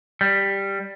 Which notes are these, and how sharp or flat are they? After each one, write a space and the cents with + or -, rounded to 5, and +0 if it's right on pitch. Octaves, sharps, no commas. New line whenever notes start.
G3 +5